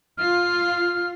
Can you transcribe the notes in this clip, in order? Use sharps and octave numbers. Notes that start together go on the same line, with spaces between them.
F4 F6